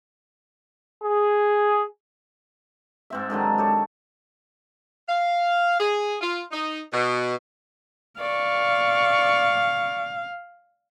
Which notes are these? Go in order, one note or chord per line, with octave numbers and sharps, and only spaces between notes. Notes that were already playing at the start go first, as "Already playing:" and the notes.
G#4
G#2 C4 E5
G#2 D3 D#3 F#3
G4 A4 C#5
F5
G#4
F4
D#4
B2
D5 F5 C#6